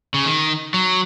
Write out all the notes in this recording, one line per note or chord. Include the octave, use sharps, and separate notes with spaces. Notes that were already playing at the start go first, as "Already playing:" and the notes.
C#3
D#3
F#3